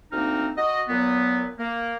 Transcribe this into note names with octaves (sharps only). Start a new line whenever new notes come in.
D2 A#3 C4 D#4 F6
F#4 D#5
A#2 F#3 B3
A#3